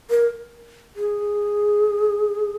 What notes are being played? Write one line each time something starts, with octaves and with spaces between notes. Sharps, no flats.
A#4
G#4